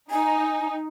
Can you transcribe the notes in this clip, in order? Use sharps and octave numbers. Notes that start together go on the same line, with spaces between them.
D#4 G#5